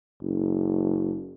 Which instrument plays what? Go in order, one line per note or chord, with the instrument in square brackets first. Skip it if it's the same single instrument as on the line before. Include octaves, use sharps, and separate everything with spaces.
[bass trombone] F#1